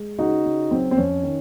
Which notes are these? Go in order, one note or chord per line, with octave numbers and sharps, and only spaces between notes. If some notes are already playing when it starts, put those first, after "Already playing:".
Already playing: G#3
C#3 D#4 F#4
C#3
F#3 C4
C4
F2 C#4
D#3